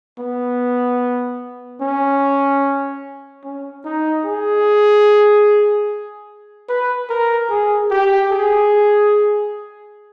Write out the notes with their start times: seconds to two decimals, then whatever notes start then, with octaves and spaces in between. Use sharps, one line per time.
0.19 B3
1.81 C#4
3.44 C#4
3.85 D#4
4.25 G#4
6.69 B4
7.10 A#4
7.50 G#4
7.91 G4
8.32 G#4